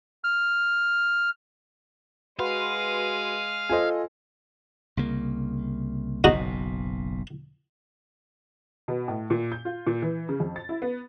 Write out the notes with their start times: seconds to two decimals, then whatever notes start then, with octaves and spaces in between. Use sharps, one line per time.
0.24 F6
2.39 G#3 F#4 B4 F5 C6 D#6
3.69 F4 A4 C5 D#5 G#5
4.97 C2 C#3 A#3
6.24 F#1 B1 B2 D#4 F#4
8.88 B2
9.08 A2
9.30 A#2
9.52 G6
9.65 F4
9.87 A#2
10.02 E3
10.29 C#3
10.40 F2
10.56 A6
10.69 E4
10.82 B3